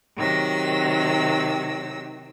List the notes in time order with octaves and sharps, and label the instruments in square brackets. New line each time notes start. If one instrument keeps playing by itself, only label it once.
[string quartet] C3 D#3 F#3 E6 A#6